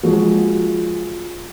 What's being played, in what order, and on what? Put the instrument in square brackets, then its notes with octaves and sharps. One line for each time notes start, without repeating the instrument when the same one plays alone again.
[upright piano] F3 G#3 F4 F#4